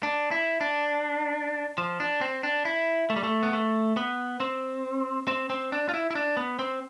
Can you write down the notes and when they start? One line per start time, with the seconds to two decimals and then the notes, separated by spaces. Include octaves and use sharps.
0.03 D4
0.31 E4
0.61 D4
1.78 F3
2.00 D4
2.21 C4
2.43 D4
2.65 E4
3.10 A3
3.16 G3
3.24 A3
3.43 B3
3.53 A3
3.97 B3
4.40 C4
5.28 C4
5.50 C4
5.72 D4
5.89 F4
5.94 E4
6.11 E4
6.15 D4
6.37 B3
6.59 C4